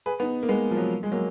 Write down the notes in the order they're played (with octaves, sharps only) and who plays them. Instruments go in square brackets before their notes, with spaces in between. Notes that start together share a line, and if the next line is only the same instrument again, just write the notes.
[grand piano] G#4 B4
B3 D#4
A#3
G#3 B3
F3
F#3
G#3
F#3 A#3